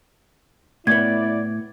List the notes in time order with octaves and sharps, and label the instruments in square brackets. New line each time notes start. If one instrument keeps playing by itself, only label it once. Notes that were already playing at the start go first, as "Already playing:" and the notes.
[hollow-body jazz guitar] A2 B3 [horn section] E4 D5 [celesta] G#6